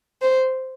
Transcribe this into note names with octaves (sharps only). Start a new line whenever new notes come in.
C5